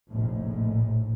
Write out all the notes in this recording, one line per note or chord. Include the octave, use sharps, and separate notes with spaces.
F1 A#1 A2